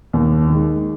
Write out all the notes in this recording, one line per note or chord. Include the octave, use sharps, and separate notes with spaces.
D#2
D#3 G#3